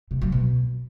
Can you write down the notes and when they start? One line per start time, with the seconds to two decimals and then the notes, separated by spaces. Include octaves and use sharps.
0.11 C3
0.22 F#3
0.32 B2